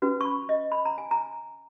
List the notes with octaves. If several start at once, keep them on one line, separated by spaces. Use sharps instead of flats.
C#4 F#4 B4
C#6
B5
D#5
B5
A#5
G#5
A#5